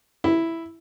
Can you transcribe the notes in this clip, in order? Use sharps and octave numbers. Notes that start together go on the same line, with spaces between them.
E4